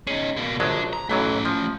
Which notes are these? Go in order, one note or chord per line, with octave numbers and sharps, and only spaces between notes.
C#4 D#4 G#4
B2 A#3
A#1 F#3 G#3 D4 A4
A#5
B1 E3 F#3 A3 C#4
F3